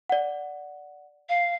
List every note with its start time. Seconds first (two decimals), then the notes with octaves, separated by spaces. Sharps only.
0.09 D5 F#5
1.29 F5